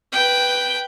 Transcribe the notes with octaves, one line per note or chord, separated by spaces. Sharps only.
B4 G5